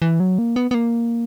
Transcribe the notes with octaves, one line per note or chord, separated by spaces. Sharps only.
E3
F#3
A#3
B3
B3
A#3